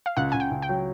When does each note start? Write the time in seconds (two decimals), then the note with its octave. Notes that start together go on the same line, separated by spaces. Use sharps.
0.06 F5
0.17 C#2 F#5
0.32 C#2 G#5
0.40 G5
0.51 C#2
0.62 G5
0.69 F#3